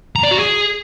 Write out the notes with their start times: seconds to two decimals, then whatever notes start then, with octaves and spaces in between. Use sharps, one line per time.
0.16 A#5
0.23 D5
0.31 F#4
0.39 G#4